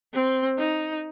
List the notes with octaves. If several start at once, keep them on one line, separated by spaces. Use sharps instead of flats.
C4
D#4